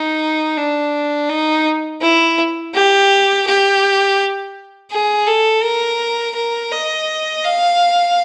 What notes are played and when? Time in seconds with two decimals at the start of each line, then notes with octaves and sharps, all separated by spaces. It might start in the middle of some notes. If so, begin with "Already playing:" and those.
Already playing: D#4
0.57 D4
1.29 D#4
2.02 E4
2.74 G4
3.47 G4
4.91 G#4
5.28 A4
5.64 A#4
6.36 A#4
6.72 D#5
7.45 F5